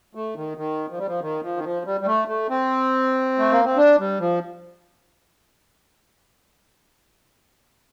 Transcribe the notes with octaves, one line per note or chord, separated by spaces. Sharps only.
A3
D#3
D#3
F3
G3
F3
D#3
F3
D#3
F3
G3
G3
A3
A3
C4
A3
A#3
C4
D4
G3
F3